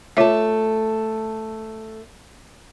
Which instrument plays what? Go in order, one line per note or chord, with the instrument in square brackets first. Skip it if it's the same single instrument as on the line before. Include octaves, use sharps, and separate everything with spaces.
[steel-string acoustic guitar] A3 A4 [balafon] F4 C#5 E5